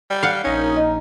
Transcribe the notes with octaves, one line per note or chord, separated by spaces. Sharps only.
G3
F5 F#5
A#1 C#4 D#4
D#5